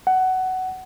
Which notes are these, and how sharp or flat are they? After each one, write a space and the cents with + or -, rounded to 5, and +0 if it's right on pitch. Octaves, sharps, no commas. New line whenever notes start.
F#5 +15